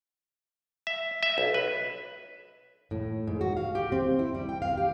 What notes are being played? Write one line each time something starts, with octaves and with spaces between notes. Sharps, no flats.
E5
E5
B1
B4
A2
G#2
F#4
F5
G4
C4
E4
G3
G5
F5
G4